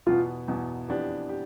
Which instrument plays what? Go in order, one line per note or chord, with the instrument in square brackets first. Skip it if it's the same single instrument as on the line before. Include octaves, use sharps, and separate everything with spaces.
[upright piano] E2 B2 B3 [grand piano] F4
[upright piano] E2 B2 B3
F2 E3 B3 D4 G4
G4